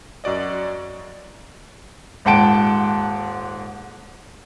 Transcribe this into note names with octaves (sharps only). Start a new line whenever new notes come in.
F#2 F#4 D5 D#5
D#1 G#2 F#5 G5 A5 D7